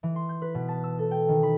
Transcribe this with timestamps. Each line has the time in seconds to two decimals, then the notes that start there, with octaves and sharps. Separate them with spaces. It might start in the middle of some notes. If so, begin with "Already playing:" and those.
0.03 E3
0.16 C6
0.29 G6
0.42 B4
0.55 B2
0.68 A5
0.84 E6
0.99 A4
1.11 G5
1.28 D#3
1.43 B5